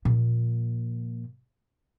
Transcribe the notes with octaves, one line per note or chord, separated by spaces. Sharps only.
A#2 F3